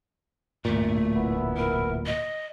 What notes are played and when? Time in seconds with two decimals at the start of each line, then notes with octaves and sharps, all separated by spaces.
0.65 D1 G2 A#2 A3
1.15 F1 E3 B3 E4
1.57 A#4
2.06 D#5